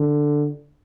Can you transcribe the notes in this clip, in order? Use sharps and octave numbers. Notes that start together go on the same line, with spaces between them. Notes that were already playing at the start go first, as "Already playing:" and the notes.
Already playing: D3